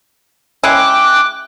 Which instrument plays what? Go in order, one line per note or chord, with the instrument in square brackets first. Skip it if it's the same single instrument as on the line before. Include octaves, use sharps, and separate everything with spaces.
[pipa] G#3 C#4 E4 [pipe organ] G5 D6 F#6